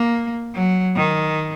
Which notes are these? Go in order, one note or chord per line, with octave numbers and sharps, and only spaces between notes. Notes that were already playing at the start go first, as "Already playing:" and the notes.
Already playing: A#3
F#3
D#3